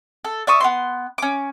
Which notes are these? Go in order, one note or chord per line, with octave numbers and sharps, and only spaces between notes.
A4
D5 E5 C#6 D#6
B3 D#4 C6
C#4 D6